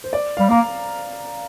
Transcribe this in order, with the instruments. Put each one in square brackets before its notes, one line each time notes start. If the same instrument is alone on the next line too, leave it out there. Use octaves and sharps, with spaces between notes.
[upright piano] C5
D5
[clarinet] G3 [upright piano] F5
[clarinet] A#3 [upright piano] A#5